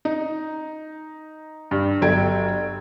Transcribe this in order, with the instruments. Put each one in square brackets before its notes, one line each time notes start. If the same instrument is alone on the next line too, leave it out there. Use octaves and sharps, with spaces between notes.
[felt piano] D#4
G2
G1 F#3 A4 G5 G#6 D7